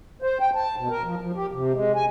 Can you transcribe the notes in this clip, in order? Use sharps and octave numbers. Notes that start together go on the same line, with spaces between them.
C5
G5
A5
B2
A#4
F3
F3
G4
C3
G#3
G#5